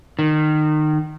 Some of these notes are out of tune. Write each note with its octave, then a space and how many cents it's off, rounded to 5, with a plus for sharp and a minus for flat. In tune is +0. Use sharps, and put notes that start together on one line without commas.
D#3 -25